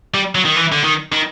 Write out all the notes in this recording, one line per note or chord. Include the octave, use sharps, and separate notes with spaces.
G3
F#3
D#3
E3
D3
D#3
D#3